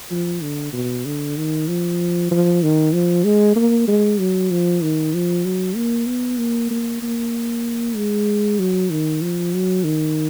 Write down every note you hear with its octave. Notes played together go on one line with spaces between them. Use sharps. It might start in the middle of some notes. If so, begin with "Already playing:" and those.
F3
D3
B2
D3
D#3
F3
F3
D#3
F3
G#3
A#3
G#3
F#3
F3
D#3
F3
F#3
A#3
B3
A#3
A#3
A#3
G#3
F#3
D#3
F3
F#3
D#3